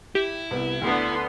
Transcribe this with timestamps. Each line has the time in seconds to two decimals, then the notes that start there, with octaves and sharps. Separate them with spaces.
0.15 E4 G4
0.51 C2 B3
0.81 D2 D3 B3 C6